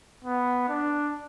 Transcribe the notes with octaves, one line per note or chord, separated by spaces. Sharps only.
B3
D4